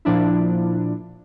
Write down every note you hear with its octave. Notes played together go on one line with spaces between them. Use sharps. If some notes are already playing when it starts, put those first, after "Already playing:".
A#2 F3 D4 E4